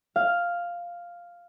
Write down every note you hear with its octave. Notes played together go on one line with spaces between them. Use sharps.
F5